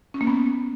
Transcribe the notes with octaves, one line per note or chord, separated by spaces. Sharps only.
C#4
A#3
B3